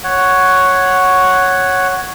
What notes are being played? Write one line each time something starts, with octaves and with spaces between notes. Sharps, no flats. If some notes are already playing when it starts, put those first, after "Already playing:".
C#5 F#5